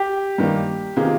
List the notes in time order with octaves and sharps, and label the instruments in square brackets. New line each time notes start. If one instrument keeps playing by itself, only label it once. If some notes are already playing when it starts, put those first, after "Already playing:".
Already playing: [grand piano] G4
[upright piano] G2 D#3 G3 A#3
C3 D#3 A#3 F4 G#4